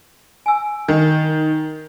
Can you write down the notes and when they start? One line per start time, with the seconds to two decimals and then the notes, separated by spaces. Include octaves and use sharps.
0.46 G#5 E6
0.88 D#3